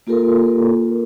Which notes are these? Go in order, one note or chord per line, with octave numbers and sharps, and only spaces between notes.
A#3 F4 G4 A4 A#4